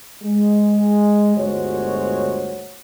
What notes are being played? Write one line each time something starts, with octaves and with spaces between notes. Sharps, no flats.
G#3
G1 D2 G#3 F#4 C5 C#5